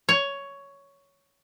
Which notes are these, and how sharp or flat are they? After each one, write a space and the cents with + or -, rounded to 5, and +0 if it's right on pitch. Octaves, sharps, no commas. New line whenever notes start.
C#5 +10